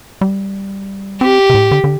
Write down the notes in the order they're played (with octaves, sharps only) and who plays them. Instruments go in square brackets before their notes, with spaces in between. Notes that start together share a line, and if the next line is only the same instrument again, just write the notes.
[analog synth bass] G3
[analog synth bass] C4 [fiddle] G4
[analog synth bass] C3
A2
D3
D3